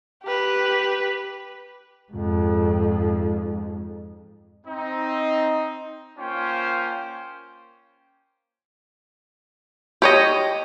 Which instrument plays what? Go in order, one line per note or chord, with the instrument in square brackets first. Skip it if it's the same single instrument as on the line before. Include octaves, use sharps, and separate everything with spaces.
[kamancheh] G4 B4
[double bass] F2 G#2
[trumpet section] C4 D#4
A#3 C#4 F4 C5 G5 C#6
[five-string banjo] G4 C#5 D#5